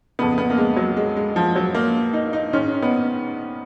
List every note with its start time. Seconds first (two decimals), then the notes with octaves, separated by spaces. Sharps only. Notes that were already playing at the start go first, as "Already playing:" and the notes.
0.19 F2 C#3 B3
0.38 B3
0.50 A#3
0.58 G#3
0.76 F#3
0.97 G#3
1.16 G#3
1.36 F3
1.56 F#3
1.75 A#3
2.13 D#4
2.33 D#4
2.53 G#2 D#3 C#4
2.82 B3